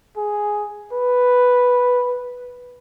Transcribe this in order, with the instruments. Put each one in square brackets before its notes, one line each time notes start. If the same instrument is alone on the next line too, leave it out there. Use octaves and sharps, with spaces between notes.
[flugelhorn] G#4
B4